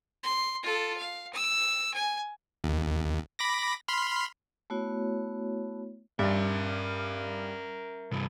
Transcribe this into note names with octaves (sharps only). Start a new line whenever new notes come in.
C6
F4 A4
F5
E6
G#5
D#2
B5 D6 A#6
B5 C6 F6
A3 B3 E4 F#4 C#5
G2 A#4 E5
C2 G2